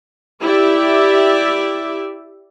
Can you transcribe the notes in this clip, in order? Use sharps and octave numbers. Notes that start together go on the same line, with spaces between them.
E4 G4 D5 E5